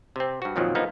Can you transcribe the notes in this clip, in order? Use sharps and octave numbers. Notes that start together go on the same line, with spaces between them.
C3 C4
G2 F#4
F2 A#2 D#3 F3 F#3
G2 F3 A#3 B3 D#4